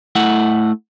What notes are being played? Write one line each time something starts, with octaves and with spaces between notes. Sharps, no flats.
A3 E4 F#5